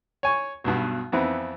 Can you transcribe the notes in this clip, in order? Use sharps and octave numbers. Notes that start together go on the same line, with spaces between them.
C#5 G#5 C#6
B1 G2 B2
F2 E3 B3 C4 E4